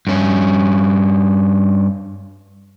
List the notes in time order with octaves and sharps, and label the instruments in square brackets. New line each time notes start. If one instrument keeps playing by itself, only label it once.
[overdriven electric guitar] G2 C#4